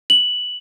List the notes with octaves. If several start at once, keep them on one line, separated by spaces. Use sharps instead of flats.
F#7